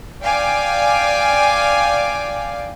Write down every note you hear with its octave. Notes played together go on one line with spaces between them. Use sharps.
D5 F5 G5 G#5 D6